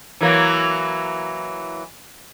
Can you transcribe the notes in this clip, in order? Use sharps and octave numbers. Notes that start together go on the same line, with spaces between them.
E3 F#3 A#3